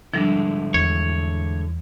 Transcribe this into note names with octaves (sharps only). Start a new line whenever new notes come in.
G#2 D3 F3 G3 D4 E4
E2 C#5